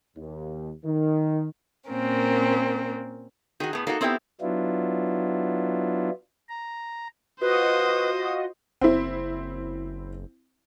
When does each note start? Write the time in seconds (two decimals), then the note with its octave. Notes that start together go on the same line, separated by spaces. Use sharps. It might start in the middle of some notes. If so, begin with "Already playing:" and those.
0.16 D#2
0.84 D#3
1.90 A#2 A#3 C4 C#4 A#4
3.60 D#3 F#4 G#4
3.73 A2 B3
3.87 A#3 D#4 F#4 A4
4.01 B3 C4 E4 G4 D5 G5
4.41 F#3 B3 D4 E4 F4
6.49 A#5
7.41 F4 F#4 B4 C5 D#5 D#6
8.81 F#1 C4 E4